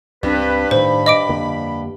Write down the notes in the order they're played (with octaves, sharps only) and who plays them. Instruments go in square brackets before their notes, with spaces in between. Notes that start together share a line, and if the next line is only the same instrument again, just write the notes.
[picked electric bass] C#2 C4 [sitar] G2 [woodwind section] B4
[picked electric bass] A2 D#3 [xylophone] C5 [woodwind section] B5
[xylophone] D#5 D6 D7
[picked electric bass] F2 D3 A#3